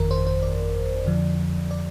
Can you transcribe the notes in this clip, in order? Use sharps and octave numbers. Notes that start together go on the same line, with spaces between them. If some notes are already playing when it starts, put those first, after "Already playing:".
Already playing: G1 F2 D#3 A#4
C5
C5
D5
F2 D3 F3
D5